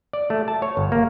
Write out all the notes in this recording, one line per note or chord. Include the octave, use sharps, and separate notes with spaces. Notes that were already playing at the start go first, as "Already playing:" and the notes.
D5
A3
A5
C#5
G1
A#3